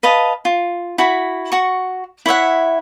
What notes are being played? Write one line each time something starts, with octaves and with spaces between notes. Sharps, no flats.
B4 D#5 F5 A5
F4
E4 F#4 B5
F#4 C#6
E4 C#5 E5 F#5